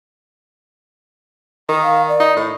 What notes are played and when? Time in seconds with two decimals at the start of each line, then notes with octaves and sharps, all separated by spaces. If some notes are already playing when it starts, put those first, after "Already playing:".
1.69 D#3
1.83 F5
2.08 D5
2.20 D#4
2.37 A2